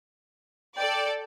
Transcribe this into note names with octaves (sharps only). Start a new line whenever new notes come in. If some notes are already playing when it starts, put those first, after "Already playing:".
A4 D5 G5